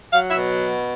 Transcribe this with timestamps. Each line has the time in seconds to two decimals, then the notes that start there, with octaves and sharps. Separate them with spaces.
0.12 F#3 F5
0.30 E5
0.37 B2